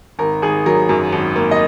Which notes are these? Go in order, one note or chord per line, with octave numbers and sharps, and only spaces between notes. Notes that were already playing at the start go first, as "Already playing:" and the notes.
G#1 A#4
G#1 G#4
F#3 A#4
F#2
G#1
A#3
D#5